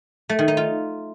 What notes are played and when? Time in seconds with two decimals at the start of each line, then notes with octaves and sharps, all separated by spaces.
0.29 A3
0.39 D#3
0.48 D#4
0.57 F4